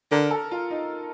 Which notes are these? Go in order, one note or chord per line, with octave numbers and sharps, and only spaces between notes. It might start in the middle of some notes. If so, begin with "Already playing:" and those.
D3 A#4
A4
F4
D#4